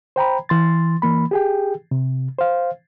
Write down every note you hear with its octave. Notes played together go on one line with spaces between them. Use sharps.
C5 G5 A#5 B5
E3 C6 A6
E3 A#3 B5
G4 G#4 G5
C3
C5 F5